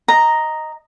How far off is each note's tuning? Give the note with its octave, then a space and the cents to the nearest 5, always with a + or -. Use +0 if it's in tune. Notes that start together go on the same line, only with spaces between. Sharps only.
D#5 +0 A#5 +0